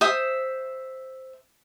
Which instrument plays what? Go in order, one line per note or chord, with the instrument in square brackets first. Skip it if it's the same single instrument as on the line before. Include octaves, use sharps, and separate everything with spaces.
[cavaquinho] C5 E5 D#6